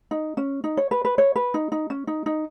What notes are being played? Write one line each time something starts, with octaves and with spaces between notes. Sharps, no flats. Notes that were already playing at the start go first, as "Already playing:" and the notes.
D#4
C#4
D#4
C#5
B4
B4
C#5
B4
D#4
D#4
C#4
D#4
D#4